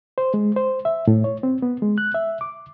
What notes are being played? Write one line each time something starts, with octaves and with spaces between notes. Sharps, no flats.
C5
G#3
C5
E5
A2
C#5
C4
B3
G#3
F#6
E5
D6